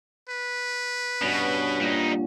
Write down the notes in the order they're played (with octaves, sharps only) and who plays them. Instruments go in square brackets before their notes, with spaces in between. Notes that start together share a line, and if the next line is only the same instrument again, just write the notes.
[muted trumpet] B4
[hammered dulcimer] G2 C#4 F#5 [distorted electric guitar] B2
[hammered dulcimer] A#2 [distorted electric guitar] G3 D#4